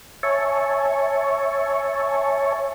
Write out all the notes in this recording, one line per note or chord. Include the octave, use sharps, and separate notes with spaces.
C#5 E5 G#5 A5 C#6